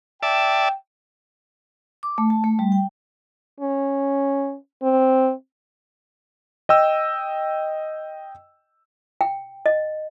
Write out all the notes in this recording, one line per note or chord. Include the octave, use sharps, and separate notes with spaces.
D5 E5 G5 A5
D6
A3
A5
A3
G3
G5
C#4
C4
D#5 G5 E6
G5
D#5